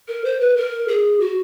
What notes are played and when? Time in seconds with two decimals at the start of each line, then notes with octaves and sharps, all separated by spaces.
0.08 A#4
0.25 C5
0.41 B4
0.57 A#4
0.88 G#4
1.20 F#4